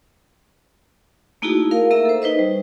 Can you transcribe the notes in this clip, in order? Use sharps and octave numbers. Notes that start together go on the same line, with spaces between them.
A3 A#3 D#4 E4 F#4 G#4
A#4 F5
A#3 A#4 E5 A#5 E6
A4 C5
D#4 B4 C5 D#5
G3